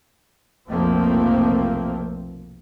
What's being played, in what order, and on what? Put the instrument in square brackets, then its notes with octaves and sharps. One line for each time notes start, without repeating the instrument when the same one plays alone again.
[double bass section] F1 B1 F3 A3 A#3 C4